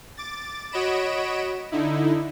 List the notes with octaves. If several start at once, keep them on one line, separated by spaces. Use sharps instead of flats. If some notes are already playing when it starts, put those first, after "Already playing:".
D6 A6
F#4 C#5 D#5 B5 D7 E7
D3 D#4 E4